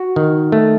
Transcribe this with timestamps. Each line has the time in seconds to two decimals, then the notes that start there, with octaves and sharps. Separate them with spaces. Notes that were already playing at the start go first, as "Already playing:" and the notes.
Already playing: F#4
0.16 D#3
0.52 A3